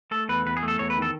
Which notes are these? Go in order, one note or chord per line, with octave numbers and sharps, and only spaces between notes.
A3 A4
E2 B4
E2 B4
G#4
A3
A4
E2 C#5
B4
D#3
A4